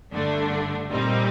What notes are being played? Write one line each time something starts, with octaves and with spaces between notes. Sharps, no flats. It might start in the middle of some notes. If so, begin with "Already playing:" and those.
G2 D3 A3 D4
A#2 G3 C4 D#4